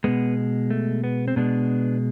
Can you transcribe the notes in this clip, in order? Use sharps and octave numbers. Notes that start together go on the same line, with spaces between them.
B2 G#3 B3
A3
B3
C4
B2 G#3 B3 D4